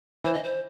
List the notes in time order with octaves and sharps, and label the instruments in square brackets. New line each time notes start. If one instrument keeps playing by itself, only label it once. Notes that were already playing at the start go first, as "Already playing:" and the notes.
[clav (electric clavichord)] E3 [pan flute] C5
[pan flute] D#5
C5